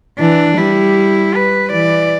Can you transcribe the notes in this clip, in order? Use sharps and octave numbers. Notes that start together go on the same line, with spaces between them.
E3 D4
G3 E4
B4
E3 D5